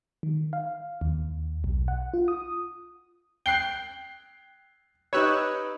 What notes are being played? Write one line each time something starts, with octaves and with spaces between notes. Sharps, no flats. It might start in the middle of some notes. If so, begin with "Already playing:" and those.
D#3
F5
D#2
B1
F#5
F4
D#6
G5 F#6 C7 G7
D#4 G4 B4 C#5 E6 F#6